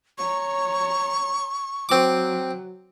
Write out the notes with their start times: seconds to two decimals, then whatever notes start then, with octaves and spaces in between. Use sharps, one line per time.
0.18 C#5 A#5 C#6
1.89 F#3 C4 D6